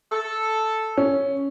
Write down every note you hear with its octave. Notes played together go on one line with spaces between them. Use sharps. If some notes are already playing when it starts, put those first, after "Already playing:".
A4
C#4